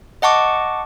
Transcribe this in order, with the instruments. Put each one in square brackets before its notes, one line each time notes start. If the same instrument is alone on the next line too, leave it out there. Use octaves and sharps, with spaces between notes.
[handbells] D#5 F#5 A5 C#6 D6